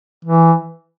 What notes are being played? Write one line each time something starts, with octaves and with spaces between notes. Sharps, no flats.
E3